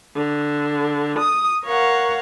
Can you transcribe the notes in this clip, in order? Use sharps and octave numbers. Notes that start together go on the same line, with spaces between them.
D3
D#6
A#4 C#5 F5 F#5